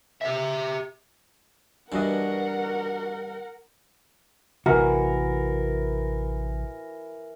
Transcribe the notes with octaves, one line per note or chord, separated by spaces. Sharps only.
G4 E5
G2 E3 D4 F#4 A#4 D#5 F#5
A1 C3 E3 F#4 A#4